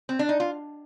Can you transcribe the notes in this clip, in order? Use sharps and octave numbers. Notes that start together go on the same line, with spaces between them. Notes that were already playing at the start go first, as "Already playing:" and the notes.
C4
D4
D#4
F4